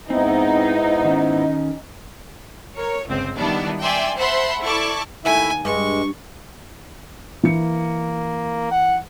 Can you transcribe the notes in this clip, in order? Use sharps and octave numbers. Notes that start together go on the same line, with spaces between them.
G#2 B3 C4 D#4 E4
D#3 C#4
A#4 C#5
G1 C#2 C4
D#3 G3 B3 D4 E4
D5 E5 G5 G#5 C6
C5 E5 F#5 A5 B5 C6
E4 A4 D5 A5 C#6 D6
D#2 A3 E4 E5 G#5
G2 G#3 C#6
E3 A#3 C#7
F#5